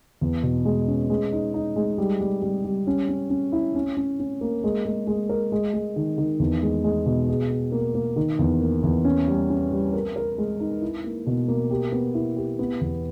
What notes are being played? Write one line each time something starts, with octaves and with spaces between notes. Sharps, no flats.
E2
B2
G#3
C#4
G#3
D#4
D#4
G#3
G3
G3
G3
G3
C#4
C#4
C#4
E4
C#4
C#4
C#4
A#3
G#3
G#3
G#3
A#4
G#3
G#3
D#3
D#3
E2
G#3
G#3
B2
G#4
G#4
A#3
A#3
D#3
E2
A#3
E2
C#4
G3
C#4
G3
A#4
A#4
G#3
D#4
E4
A#3
B2
A#3
G4
B3
E4
G4
B3
E2